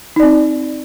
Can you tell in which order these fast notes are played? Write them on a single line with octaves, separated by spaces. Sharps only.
D#4 D5 C4